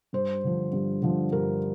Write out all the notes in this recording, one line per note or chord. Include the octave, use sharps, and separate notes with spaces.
G2 C5
D3 F3
G2
D3 F3
G2 A#4